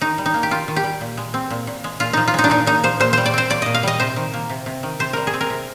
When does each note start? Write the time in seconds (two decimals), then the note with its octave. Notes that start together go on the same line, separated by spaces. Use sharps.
0.01 D#3 D#4
0.18 G3
0.26 D#4
0.34 A#3
0.43 G4
0.51 D#3 F4
0.68 D#3
0.76 G4
0.84 G3
1.01 A#2
1.17 G#3
1.34 C4
1.50 A#2
1.67 A#2
1.84 G#3
2.00 A#2 F4
2.13 F3 D#4
2.28 F4
2.34 G#3 D#4
2.44 D4
2.50 A#2 D#4
2.67 A#2 D#4
2.84 F3 C5
3.00 A#2 C5
3.13 G3 C5
3.26 D5
3.34 C4 C5
3.50 A#2 D5
3.62 A#2 D#5
3.74 F5
3.83 G3 D#5
4.00 C3 C5
4.16 D#3
4.34 A#3
4.49 C3
4.66 C3
4.83 D#3
4.99 C3 C5
5.13 G3 A#4
5.27 G#4
5.34 C4
5.41 A#4
5.50 C3